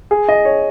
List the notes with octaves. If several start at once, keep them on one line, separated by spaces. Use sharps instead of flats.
G#4
D#5
C#5